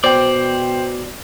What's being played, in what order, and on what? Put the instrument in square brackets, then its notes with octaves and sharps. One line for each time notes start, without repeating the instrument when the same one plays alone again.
[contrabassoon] B2 [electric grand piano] C5 G5 [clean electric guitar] D5